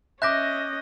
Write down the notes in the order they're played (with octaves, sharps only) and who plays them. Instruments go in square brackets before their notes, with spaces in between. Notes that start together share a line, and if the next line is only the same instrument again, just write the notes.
[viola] C#4 D#5 [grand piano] E5 D6 [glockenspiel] F#6 G6 A#6